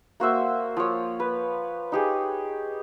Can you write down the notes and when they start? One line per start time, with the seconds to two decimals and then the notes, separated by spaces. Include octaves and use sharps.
0.20 A#3 F#4 C5 E5
0.77 F3 C#5
1.20 B4
1.92 D#4 G4 G#4